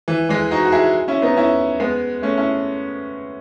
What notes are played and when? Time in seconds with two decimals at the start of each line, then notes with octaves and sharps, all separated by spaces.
0.08 E3
0.29 E3 G#3
0.51 D#4 F#4
0.65 F#4
0.72 E4 G#4
1.08 C#4 E4
1.22 B3 D#4
1.36 C#4 E4
1.80 G#3 B3
2.22 A3 C#4
2.37 C#4 E4